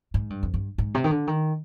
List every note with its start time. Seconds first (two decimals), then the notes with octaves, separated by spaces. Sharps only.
0.14 G#2
0.30 G2
0.43 F2
0.54 G2
0.78 G#2
0.94 C3
1.04 D#3
1.11 D3
1.27 D#3